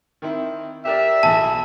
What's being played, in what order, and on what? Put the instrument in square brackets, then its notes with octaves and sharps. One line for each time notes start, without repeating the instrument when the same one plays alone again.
[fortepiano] D#3 C4 E4
[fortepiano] G4 A#4 D5 [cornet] E5
[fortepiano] B1 E3 G#4 [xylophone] A5